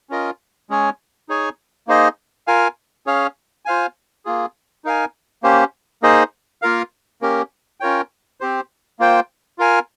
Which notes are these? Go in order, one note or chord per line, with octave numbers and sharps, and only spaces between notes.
C#4 F4 A#4 D#5
G#3 C#4 G#4 C#5 G#5
D#4 G#4 C#5 G#5
A#3 D#4 G#4 C5 D#5
F4 A#4 F5 G#5
C#4 G#4 C#5 F5
F4 C5 F5 G#5
A#3 F4 G#4
D#4 A#4 F5 G#5
A#3 C#4 G4 C5
A#3 D#4 G#4 C5 D#5
A#3 F4 A#4 F5
A#3 C#4 G4 A#4
C#4 F4 A#4 C#5 G5
C4 G4 C5
A#3 F4 C5 G5
F4 A#4 F5 G#5